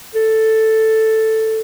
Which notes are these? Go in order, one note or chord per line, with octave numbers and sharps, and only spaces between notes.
A4